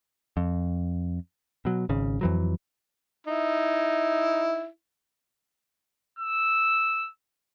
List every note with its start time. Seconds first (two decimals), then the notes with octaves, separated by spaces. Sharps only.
0.37 F2
1.65 B2 F#3
1.89 G#1 C#3
2.21 F2 E3 F#3
3.27 D#4 E4
6.19 E6